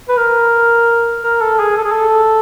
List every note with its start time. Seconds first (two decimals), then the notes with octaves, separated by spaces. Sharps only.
0.08 B4
0.17 A#4
1.24 A#4
1.41 A4
1.59 G#4
1.77 A4
1.84 G#4
1.92 A4